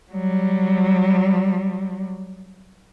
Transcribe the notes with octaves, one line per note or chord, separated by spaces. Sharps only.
F#3 G3